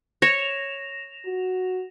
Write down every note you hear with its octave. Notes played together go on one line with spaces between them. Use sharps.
C#5 A#6 E7 F7
F#4